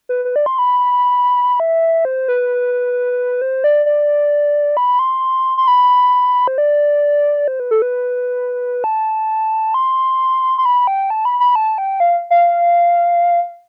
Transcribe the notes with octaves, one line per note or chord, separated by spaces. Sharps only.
B4
B4
D5
C6
B5
E5
C5
B4
C5
D5
D5
B5
C6
C6
B5
C5
D5
C5
B4
A4
B4
A5
C6
C6
B5
G5
A5
B5
B5
A5
G5
F5
F5